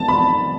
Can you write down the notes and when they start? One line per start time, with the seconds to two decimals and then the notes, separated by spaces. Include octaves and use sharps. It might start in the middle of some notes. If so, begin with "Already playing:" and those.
Already playing: A5
0.08 B5